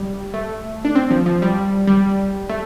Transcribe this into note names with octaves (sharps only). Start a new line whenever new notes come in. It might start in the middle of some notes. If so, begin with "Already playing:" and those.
Already playing: G3
A3
D4
C4
F3
F3
G3
G3
A3